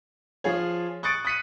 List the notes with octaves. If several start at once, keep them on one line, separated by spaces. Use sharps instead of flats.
F3 F4 G#4 C#5
C#6 D#6 F#6 A6 C#7 D7
D#6 F#6 B6 C#7 D#7